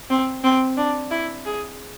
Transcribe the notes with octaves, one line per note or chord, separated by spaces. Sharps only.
C4
C4
D4
E4
G#4